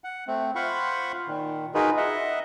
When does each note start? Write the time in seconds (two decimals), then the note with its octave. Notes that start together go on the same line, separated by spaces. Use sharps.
0.04 F#5
0.27 A3 C4
0.55 F4 C5 F5 F#5 B5 C#6
1.27 A#2 D#3
1.74 D#4 F4 F#4 G#4 A#4 B4
1.97 D#5 E5 F#5